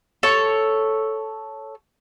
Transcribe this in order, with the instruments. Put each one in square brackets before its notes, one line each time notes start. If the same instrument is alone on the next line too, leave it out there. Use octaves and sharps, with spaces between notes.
[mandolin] A4 C#5